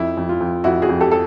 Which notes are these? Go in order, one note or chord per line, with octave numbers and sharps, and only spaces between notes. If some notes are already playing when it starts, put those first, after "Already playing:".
Already playing: F2 E4
F2
F4
F2
F2 E4 F#4
F#4 G#4
F2
G4 A4
A4